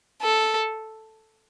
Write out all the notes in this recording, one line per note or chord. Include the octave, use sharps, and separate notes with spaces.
A4